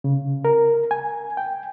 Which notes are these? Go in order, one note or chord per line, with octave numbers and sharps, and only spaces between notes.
C#3
A#4
G#5
G5